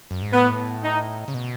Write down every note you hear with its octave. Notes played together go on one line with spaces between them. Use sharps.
F#2
G#2
A2 B3
D#4
C#3
B2